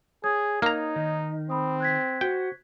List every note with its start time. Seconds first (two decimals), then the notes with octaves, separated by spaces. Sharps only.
0.24 G#4 C#5 D#6 G#6
0.62 A#3 D#4 A#5
0.96 D#3
1.50 C4 B5 D#6
1.80 F#6 G#6 B6
2.21 F#4 C5 G5